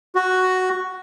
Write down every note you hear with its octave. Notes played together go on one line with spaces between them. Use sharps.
F#4